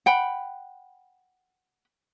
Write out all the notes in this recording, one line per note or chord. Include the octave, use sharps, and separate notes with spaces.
F#5 G5 B5